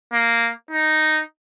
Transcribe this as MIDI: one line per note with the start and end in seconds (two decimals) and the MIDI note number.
0.13 0.50 58
0.71 1.21 63